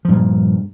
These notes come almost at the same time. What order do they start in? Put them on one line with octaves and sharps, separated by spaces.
F3 G2 A#2